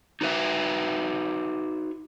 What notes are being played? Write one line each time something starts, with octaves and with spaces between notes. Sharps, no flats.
D#4 F#4 B4 E5